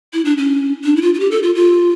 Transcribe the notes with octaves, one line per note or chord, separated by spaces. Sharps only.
E4
D4
C#4
D4
E4
F4
F4
G4
A4
F4
F4